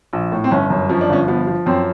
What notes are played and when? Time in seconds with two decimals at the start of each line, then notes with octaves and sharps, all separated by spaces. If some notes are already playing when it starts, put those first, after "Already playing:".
0.13 A#1
0.32 A2
0.44 C4
0.51 G1 C#4
0.70 F#2
0.89 F3 C#4
1.01 D4
1.09 G1 C#4
1.28 F3 B3
1.47 F3
1.66 F#2 C4